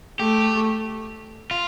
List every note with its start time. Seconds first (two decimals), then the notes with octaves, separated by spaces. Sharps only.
0.20 A3 G4
1.51 F4